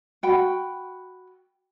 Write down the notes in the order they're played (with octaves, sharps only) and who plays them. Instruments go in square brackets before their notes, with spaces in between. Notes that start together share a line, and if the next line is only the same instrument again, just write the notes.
[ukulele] F#4 G5 B5